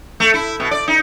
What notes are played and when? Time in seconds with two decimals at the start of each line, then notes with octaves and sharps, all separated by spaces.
0.20 A3
0.34 E4
0.60 B2
0.71 D5
0.88 D#4